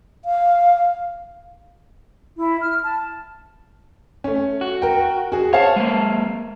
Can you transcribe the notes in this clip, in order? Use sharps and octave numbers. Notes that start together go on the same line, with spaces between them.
F5
E4
F6
A5
A3 C#4
F#4
A#4 G5
F#4 G#4
C5 C#5 F5 A5
G#3 A#3